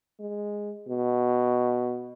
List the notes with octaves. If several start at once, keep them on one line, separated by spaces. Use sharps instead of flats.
G#3
B2